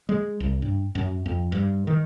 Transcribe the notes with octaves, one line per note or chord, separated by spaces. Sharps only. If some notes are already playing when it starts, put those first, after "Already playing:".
G#3
C2
G2
F#2
F2
G2
D#3